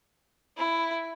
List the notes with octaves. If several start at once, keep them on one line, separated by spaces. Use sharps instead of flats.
E4